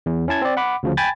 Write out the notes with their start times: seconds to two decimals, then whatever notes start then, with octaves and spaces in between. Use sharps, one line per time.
0.06 E2
0.28 C#4 E4 A5 G#6
0.42 C4 D5
0.57 F#5 B5 D6
0.83 D2 C#3 F3
0.97 G5 G#5 B5 G#6 A6